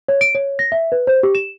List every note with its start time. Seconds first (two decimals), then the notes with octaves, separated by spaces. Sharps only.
0.08 C#5
0.21 D7
0.35 C#5
0.59 A#6
0.72 E5
0.92 B4
1.07 C5
1.23 G4
1.35 E7